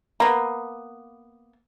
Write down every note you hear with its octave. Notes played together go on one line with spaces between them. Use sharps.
A#3 B3